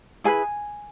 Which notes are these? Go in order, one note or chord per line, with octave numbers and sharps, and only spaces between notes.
E4 G#4 B4 G#5